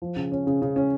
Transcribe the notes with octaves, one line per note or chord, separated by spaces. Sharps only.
F3
C#3
C#4
C#3
C#3
C#4